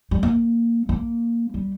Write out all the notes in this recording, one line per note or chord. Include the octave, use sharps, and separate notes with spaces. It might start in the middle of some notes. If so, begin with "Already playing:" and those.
G3
A#3
A#3
G3